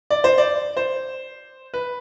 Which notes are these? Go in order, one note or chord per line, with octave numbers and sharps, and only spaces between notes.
D5
C5
D5
C5
B4